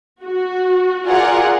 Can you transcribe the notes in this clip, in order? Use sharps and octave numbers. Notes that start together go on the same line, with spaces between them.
F#4
F4 G#4 A#4 D5 F#5